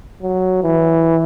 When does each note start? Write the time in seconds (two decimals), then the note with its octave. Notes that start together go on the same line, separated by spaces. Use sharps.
0.22 F#3
0.63 E3